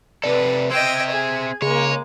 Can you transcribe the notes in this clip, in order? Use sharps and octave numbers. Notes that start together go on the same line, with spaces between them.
C3 A4 B4 D5
C4 D#5 E5 G5 G#6
G#4
C#3 G#3 A#3 C#5